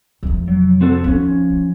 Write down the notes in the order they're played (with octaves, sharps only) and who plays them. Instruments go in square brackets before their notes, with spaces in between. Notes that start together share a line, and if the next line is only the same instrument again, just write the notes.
[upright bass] F2 C3
[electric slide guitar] F#3
C4 F#4 A4
[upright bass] D#2 [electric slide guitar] F3 C#4
[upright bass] C#3